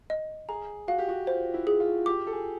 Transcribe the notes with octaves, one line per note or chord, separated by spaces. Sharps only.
D#5
G#4 A#5
F#4 F5
G4
F#4
F4 C5
E4
G#4
F4
G4 D6
A4
G#4